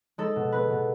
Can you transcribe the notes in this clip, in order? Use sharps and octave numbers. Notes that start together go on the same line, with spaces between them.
G#3 A4
B2
B3 B4
B2